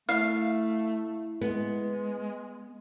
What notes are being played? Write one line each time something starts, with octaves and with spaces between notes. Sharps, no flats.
A3 E4 F5
G#3 B3